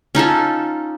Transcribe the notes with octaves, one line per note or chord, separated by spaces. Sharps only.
C#4 D#4 F4 A4